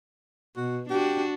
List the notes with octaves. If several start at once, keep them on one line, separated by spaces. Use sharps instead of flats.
B2 F#4
D4 F#4 G4